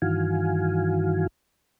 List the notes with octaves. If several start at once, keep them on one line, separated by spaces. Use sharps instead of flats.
G2 D#3 E3 F#4 F5 G#5